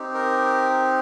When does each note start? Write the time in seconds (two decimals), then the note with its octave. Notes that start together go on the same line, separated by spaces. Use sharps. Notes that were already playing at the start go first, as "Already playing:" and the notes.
Already playing: C4 D#4 G4
0.14 A#4